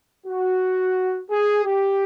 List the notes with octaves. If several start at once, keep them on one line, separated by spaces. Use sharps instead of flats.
F#4
G#4
G4